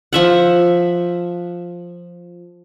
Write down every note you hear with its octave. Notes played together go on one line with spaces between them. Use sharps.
F3 E5 F#5